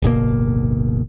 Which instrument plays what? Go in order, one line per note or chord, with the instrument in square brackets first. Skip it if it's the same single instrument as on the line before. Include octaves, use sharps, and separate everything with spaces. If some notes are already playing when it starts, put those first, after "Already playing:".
[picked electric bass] D1 G1 B2 A#3